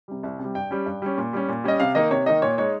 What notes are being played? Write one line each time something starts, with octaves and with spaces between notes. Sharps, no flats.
C3 G3
C2
C3 G3
G2 G5
G3 C#4
G2
G3 C#4
A#2
G3 C#4
A#2
G3 C#4 D#5
C3 F5
D#3 A#3 D#4 D#5
C3 C#5
D#3 A#3 D#4 D#5
A#2 C#5
G#3 D#4 C#5